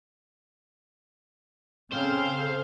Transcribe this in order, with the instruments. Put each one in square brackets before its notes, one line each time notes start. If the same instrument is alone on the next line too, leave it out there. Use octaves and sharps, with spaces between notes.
[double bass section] C#3 [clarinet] C4 [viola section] G#4 A4 F5 [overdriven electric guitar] C5